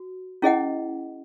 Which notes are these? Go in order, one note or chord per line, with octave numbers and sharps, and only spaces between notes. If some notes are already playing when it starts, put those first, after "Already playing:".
Already playing: F#4
C#4 E4 G#4 D#5 F#5